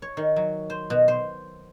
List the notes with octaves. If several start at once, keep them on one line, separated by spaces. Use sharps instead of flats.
C#5
D#3
F#3
C5
B2
C5